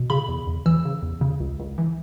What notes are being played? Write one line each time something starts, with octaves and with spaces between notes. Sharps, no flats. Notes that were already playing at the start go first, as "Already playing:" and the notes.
Already playing: B2
C#3 B5
E2
E2
E3 E6
C#3
E2
C#3
C#2
C#2
E3